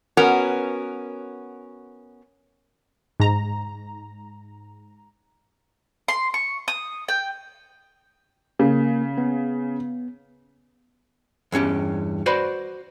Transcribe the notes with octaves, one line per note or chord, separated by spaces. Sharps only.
B3 C#4 F#4 A#4
G#2 A#5
C6
C#6
D#6
G5
C#3 A#3
B3
E2 G2 C#4 G4
F#4 B4 C5 D5 B5